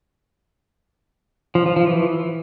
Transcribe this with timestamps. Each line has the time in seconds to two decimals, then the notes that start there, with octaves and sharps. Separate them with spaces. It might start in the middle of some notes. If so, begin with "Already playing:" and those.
1.55 F3
1.66 F3
1.76 F3
1.87 E3